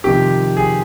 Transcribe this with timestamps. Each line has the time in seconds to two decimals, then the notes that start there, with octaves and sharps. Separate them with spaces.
0.04 F2 C3 D#3 G4
0.57 G#4